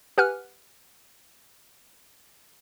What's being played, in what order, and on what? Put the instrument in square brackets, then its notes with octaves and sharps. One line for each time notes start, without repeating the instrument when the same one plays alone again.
[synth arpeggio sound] G4 B4 F#5 G#5 F6 F#6